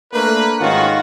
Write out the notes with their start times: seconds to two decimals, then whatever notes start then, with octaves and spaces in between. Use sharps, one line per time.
0.12 A3 A#3 D4 A#4 B4
0.59 G#2 D#3 C#4 F4 F#4 F#5